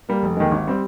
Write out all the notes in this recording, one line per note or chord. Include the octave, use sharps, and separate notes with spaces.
G3 A#3
F1
D#2 D#3 G#3
G#1
G3 C4